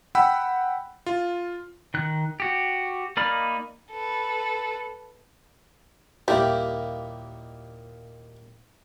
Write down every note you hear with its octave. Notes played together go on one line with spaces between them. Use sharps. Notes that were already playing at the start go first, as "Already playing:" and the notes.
F#5 G5 B5 E6
F4
D#3 F#6
F#4 G4
A#3 D#4 D5 B5 F6
A4 B4
D#2 A#2 G3 A#3 E4 G4